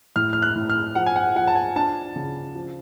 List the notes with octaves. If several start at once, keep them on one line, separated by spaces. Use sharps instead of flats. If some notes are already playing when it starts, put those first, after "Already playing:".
A2 F6
F6
F#6
A2
F6
F3 F#5
G#5
F#5
F3 F#5
A5
G#5
D4 A5
C#3
F3